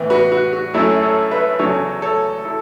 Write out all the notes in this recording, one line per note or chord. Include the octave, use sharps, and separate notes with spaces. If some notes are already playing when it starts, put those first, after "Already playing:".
Already playing: A2 E3 B3
F#4 B4
F#4
F#4
F#2 F#3 A3 C#4 E4 A4
A4 C#5
B4 E5
E2 C#3 F#3 C#4 A4 C#5
A4 C#5
E4 A4